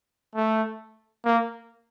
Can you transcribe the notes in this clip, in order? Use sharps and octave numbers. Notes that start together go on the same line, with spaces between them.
A3
A#3